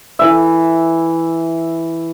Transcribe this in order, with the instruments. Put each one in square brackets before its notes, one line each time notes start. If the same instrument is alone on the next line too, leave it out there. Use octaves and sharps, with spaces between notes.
[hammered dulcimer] E3 E5